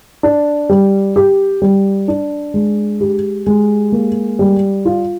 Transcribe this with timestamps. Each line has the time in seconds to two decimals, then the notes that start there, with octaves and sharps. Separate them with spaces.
0.23 D4
0.69 G3
1.16 G4
1.62 G3
2.08 D4
2.54 G#3
3.01 G4
3.47 G#3
3.92 A#3
4.39 G3
4.85 F4